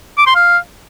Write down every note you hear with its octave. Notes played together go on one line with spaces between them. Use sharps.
D6
C6
F5